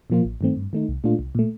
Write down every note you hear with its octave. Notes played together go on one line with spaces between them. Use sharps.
A#2 F3 A#3 F4
A1
G2 D#3 A3 C4
G2
D#3 A3 D#4
C2
A#2 A3 D4 F4
C2
A#2 A3